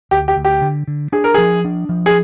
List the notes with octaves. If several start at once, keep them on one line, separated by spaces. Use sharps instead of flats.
D2 G4
G4
D2
G4
D3
D3
D4 G#4
A#4
F3 G#4
D4
F3
G#4